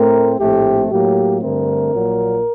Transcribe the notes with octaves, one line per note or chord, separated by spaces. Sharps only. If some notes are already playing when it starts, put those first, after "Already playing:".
Already playing: A2 A3 C4 A#4
A#1 A2 A3 C4 G4
A2 F#3 A#3 G4
G2 D3 A3 C4 A#4
A#1 A#2 F#3 A#3